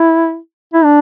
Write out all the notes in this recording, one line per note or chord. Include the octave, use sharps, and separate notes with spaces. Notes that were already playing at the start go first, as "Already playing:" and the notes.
Already playing: E4
E4
D4